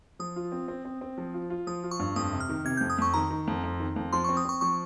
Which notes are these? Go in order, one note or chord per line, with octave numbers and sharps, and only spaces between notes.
F3 D#6
F4
C4
C4
C4
C4
F3
F4
F4
F3 D#6
F4
C#6
G2
F2 D#6
C3
F6
D#3
C3 G#6
F2 G6
D#6
F2 C#6
D#3 A#5
D#3
F2
F2
D#3
F2
F3 C6
C4 C#6
D#6
C4 C#6
F3 C#6